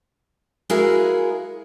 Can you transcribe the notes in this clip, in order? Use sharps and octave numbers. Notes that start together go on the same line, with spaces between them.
G#3 E4 F#4 G#4 A#4 F5